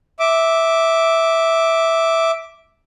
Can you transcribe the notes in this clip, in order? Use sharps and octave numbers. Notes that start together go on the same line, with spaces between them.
E5 D6